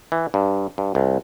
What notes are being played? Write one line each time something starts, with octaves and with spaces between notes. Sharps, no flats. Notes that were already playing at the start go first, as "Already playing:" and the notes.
E3
G2
G2
C2